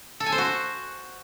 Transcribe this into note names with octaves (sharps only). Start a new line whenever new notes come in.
A4
G#5
C5
F#4